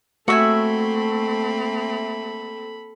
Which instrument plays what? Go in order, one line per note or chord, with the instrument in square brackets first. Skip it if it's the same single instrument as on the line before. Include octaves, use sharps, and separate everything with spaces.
[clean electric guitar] A3 [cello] A#3 C4 [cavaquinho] F#4 E5 G#5 [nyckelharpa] A4 B5